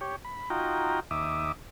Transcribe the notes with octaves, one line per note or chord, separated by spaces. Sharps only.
G4 C#5
B5
D#4 F4 F#4 G5 A#5
D#2 E5 D6 D#6